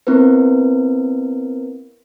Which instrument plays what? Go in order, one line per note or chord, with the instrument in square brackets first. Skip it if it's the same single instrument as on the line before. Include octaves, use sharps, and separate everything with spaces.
[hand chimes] B3 C4 E4 A#4 B4